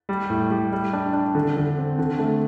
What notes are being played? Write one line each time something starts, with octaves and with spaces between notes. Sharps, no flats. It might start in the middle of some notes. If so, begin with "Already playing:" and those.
G3
A2
G3
G3
D4
D4
D3
D3
C4
D3
A3